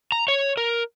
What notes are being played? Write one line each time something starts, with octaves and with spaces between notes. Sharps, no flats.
A#5
C#5
A#4